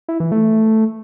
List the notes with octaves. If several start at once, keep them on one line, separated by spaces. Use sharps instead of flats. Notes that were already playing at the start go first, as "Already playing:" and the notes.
E4
E3
A3